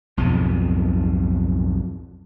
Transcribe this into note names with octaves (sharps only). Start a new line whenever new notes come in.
B1 F2 G#2 B2